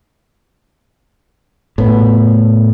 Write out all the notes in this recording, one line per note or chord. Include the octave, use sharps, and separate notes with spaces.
A2 B3